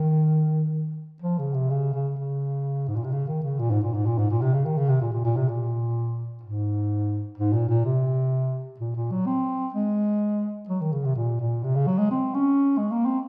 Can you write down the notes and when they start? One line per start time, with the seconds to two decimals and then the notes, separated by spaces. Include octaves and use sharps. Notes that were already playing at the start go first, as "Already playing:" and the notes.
Already playing: D#3
1.22 F3
1.39 C#3
1.54 C3
1.70 C#3
1.93 C#3
2.17 C#3
2.88 G#2
2.96 A#2
3.04 C3
3.12 C#3
3.28 D#3
3.43 C#3
3.59 A#2
3.71 G#2
3.83 A#2
3.94 G#2
4.06 A#2
4.18 G#2
4.30 A#2
4.42 C3
4.54 C#3
4.66 D#3
4.78 C#3
4.89 C3
5.01 A#2
5.13 A#2
5.25 A#2
5.37 C3
5.48 A#2
6.43 G#2
7.38 G#2
7.53 A#2
7.69 A#2
7.85 C3
8.80 A#2
8.95 A#2
9.12 F#3
9.26 C4
9.74 G#3
10.69 F#3
10.81 D#3
10.92 C#3
11.05 C3
11.16 A#2
11.40 A#2
11.64 C3
11.75 C#3
11.87 F#3
11.99 G#3
12.11 C4
12.34 C#4
12.78 G#3
12.91 A#3
13.05 C4